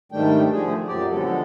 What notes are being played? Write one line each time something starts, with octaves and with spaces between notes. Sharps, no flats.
G#2 D#3 G3 A3 D4 G5
D3 F3 A3 G#4
F#2 A#2 F#3 G4 D5
D3 F3 F#3 G#3 B3 A4